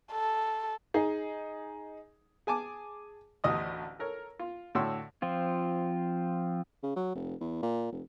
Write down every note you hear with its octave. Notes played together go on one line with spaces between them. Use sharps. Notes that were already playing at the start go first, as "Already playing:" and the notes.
A4
D#4 G#4
G#4 G#5 A5 D6
A1 D2 D#5 D#6
A4 A#4 C#5
F4
A2 D3 F#4 C#5 C6 E6
F3 C4 F4
C#3
F#3
F1
E2
A#2
F1